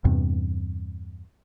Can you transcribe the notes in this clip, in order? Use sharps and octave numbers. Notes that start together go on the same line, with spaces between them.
E2 G2 C3